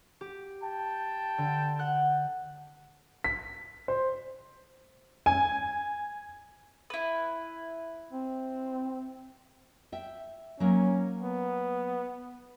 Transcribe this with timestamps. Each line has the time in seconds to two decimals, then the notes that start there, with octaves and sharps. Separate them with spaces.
0.21 G4
0.63 G5 A5
1.38 D3
1.79 F#5 F#6 G6
3.24 B6
3.88 C5
5.26 G#5
6.90 E4 B4
8.13 C4
9.92 E5 G5
10.60 F#3 A#3 C#4
11.23 B3